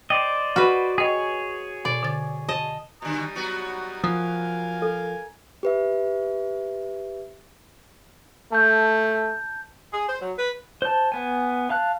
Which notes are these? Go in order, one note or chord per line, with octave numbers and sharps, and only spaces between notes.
C5 D5 D#5 G5
F#4 B4 F6
G#4 C#5 D#5 G5
B2 D5
D3 A6
D#5 A5
B2 D3 G3 A#5 D#6
F#3 B3 F#4
F3 A#4 F5 G#5 D#6
A4
G4 B4 E5
A3 A5 G6
G#4
C5
F#3
B4
C5 A5
B3 G#5
F5 A5 F#6